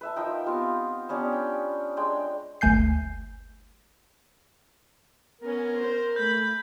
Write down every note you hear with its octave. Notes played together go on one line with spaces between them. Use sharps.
B4 E5 A5
F3 D#4 A#4 G5
B3 C4 F4 G4
B3 C#4 D4 G4
G5
G#3 D4 G5
G1 D2 A3 G#5 G6 C7
B3 C#4 A#4
C5
A3 B5 G6